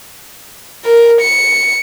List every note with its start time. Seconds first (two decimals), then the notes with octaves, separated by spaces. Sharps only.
0.85 A#4
1.21 C#7